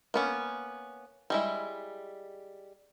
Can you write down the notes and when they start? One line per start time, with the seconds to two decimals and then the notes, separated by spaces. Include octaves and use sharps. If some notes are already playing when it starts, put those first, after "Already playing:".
0.14 A#3 B3 C#4
1.30 G3 G#3 E4